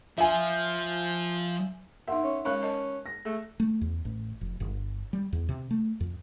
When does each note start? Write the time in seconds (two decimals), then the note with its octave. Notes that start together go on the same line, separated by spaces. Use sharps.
0.18 F3 E5 G#5
2.08 D#4 A#4 E5 F#5 C6
2.24 C#4
2.45 G#3 C#4 A#4 F5 B5 F#6
2.62 A#4 D#5 A5
3.06 A#6
3.25 A3 G#4
3.60 A3
3.81 E2
4.05 A1
4.41 F1
4.60 G1
5.13 G3
5.33 E2
5.49 C3
5.71 A3
6.01 F2